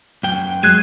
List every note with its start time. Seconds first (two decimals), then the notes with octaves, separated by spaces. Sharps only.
0.23 F#2 G5
0.63 F#3 G#3 F#6 G#6 D#7